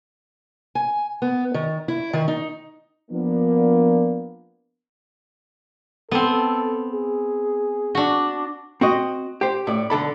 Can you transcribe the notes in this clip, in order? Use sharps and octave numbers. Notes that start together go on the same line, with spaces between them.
G#5
B3
D#3
E4
D#3
D#4
F3 A#3 B3 D4
B3 C4 A4
G#4
D4 F#4
C4 F#4 D#5
G4 C5
A2 D5
B1 D3 A4 B5